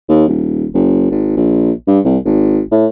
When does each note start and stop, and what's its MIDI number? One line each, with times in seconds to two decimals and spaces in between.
0.09 0.27 39
0.28 0.66 27
0.74 1.09 30
1.11 1.33 32
1.37 1.71 34
1.88 2.00 43
2.05 2.18 36
2.25 2.61 32
2.72 2.87 45